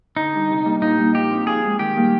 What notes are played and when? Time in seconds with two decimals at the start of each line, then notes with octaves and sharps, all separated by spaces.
0.17 D3 D#4
0.33 G3 D4
0.50 C3
0.65 G3 A#3 D4
0.82 A#2 D#4
0.98 G3 A#3
1.15 F3 G4
1.30 C4 D#4
1.47 F3 G#4
1.64 G#3 D#4
1.79 D#3 G4
1.96 G3 A#3